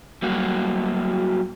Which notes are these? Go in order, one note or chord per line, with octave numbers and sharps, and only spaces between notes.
F#3 G3 A#3 F#4